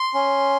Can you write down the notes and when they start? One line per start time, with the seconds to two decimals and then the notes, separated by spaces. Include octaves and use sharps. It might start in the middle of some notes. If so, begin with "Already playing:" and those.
Already playing: C6
0.14 C#4